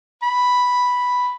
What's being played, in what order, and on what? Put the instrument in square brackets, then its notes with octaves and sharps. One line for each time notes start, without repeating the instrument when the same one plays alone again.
[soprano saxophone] B5